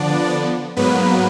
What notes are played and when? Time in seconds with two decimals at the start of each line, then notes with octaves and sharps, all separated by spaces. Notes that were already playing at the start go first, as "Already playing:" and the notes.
Already playing: D3 F3 B3 D4 D5
0.77 G#2 F#3 A#3 B3 B4